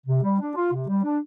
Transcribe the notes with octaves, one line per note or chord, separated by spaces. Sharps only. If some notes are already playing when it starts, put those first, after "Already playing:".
C3
G3
D4
F4
C3
G3
D4